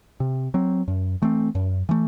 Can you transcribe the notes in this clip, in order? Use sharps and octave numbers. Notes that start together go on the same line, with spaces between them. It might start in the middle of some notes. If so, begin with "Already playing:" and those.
C3
F#3 C4
F#2
E3 A3 C4
F#2
E3 A3